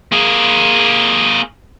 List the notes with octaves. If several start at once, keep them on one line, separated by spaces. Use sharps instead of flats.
A#3 G#4